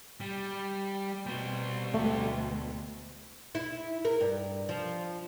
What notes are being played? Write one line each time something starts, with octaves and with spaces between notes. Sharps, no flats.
G3
B2 G3 C4
D2 B2 G#3 A3
E4
A#4
G2
F3